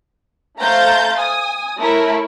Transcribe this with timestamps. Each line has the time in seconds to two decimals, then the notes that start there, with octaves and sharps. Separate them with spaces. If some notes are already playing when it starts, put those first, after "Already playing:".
0.60 A3 C5 F5 A#5 G6 A6
1.18 G#5 D#6
1.79 A3 E4 A#4 C#5